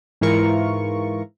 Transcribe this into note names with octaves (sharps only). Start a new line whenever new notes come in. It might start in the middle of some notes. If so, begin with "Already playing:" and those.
G#2 E3 E4 F4 A#4 C#6